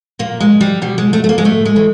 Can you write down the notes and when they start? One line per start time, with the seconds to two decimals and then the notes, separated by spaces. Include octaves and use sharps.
0.19 A#2 A#3
0.40 G#3
0.61 G3
0.82 B2 G3
0.98 G#3
1.13 A3
1.24 A3
1.29 A#3
1.38 G#3
1.44 A2 A3
1.65 G#3
1.76 E3